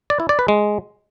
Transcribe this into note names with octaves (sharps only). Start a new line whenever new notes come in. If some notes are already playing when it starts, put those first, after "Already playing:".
D5
E4
D5
B4
G#3